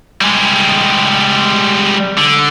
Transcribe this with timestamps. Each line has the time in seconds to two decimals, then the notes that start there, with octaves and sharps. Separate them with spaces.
0.21 G3 G#3
2.17 D3